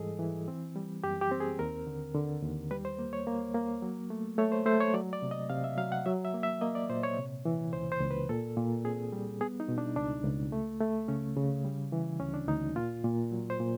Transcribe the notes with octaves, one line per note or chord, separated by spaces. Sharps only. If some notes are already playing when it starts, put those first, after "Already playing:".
Already playing: G#2 E3 G3 G#4 A4 D#5
E3
C4
G3
F#2 G4
G4
C4
G#4
D#2 A#4
D3
D3
D#2
G3 B4
C5
A#3
C#5
A#3
A#3
F#3
A3
A3 C#5
C5
A3 C5
C#5
F#3 D5
D5
C3
D#5
C3 F5
E5
F#3 F5
F#5
F#3 E5
E5
A#3
E5
A#3 D#5
D5
A#2 C5
C#5
C3
E3
C#2 C5
C5
C#2
B4
A#2 A4
A#2
C4 G#4
G3
B3 G#4
D#4
B2
D4
C#2 D4
C#2
A3
A3
C#3 C#4
C#3
G3
E3
D2 C#4
D4
D2 D#4
A#2 F4
A#2
F#3
C5
A#2